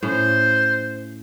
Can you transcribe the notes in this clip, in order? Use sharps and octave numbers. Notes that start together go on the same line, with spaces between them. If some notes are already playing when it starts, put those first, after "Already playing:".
A2 C#4 C5